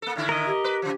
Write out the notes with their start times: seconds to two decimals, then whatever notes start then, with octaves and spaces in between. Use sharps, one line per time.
0.02 A#3 A4
0.16 A2 D3 E4
0.29 A#4 D#5
0.46 G4
0.64 B4
0.82 C#3 F3